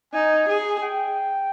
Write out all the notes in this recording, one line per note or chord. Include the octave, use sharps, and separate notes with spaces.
D#4 G#5
G#4
G5